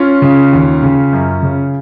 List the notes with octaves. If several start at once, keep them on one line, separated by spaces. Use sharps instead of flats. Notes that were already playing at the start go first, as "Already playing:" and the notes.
Already playing: C#4 F4
C#3
D#2
C#3
F#2
C#3